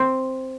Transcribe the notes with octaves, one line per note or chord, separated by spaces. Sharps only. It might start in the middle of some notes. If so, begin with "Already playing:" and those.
Already playing: C4